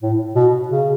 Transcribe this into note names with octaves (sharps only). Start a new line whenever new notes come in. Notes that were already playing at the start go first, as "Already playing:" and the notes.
A2
B2
C#3